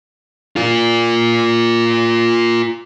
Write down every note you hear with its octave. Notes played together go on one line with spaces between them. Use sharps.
F4 A#4